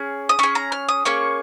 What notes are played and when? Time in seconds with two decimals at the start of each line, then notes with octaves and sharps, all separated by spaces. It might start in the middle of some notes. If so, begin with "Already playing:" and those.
Already playing: C#4 G#4
0.29 D#6
0.39 C#4 G#4 C#6
0.55 A#5
0.72 F6
0.89 D#6
1.05 A#3 C#4 G#4 C#6